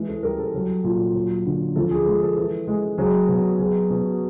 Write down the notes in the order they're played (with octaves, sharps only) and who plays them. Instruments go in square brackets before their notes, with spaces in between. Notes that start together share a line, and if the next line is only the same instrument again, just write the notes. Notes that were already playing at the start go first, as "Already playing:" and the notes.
Already playing: [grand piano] E3 G#3
A4
G3 A#4
A4
F#3
A#2
F#3
D3
F3 A4
G#4
G#3 A4
A4
E3 A4
G#3
F#3 G#4
B2
F#3 G#4
B2